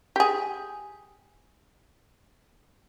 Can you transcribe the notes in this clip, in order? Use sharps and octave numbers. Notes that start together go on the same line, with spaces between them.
G4 G#4